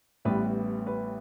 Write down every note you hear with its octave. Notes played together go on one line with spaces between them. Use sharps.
A1 A2 G3 B3 B4
B4